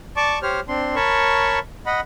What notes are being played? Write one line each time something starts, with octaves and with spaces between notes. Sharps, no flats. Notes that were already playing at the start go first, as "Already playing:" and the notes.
D5 A5 C#6 D6
G4 C5 C#5 F6
C4 D4 C6
A#4 C#5 A5 B5 C#6
D#5 F#5 B5